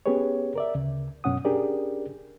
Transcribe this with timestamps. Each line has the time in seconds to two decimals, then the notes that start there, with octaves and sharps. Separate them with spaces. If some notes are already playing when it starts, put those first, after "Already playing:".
0.06 B3 C#4 G4 G#4 B4 C#5
0.55 A#4 D5 E5
0.75 D2 C#3
1.24 F#2 B2 C#4 F#5 D#6
1.45 C#4 D4 G4 G#4 A#4 D5